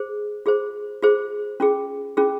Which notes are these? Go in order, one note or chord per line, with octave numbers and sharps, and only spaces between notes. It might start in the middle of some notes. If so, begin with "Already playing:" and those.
Already playing: G#4 C5
F4 G#4 C5
F4 G#4 C5
C#4 F4 G#4
C#4 F4 G#4